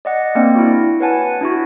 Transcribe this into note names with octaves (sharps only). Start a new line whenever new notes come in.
D5 D#5 F#5
A#3 C4 D4 D5 C#7
E4 F#4
B4 C#5 F#5 G#5 A5
D4 E4 F#4